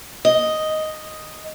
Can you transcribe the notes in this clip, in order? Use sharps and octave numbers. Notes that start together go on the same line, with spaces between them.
D#5